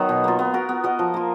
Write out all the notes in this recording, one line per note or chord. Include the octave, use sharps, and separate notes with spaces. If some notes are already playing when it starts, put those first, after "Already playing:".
Already playing: D#3 F#3 B3
B2
A#3 F4
B3
F#4 A#4
B3
F#4 A#4 D#5
F3
A#3 F4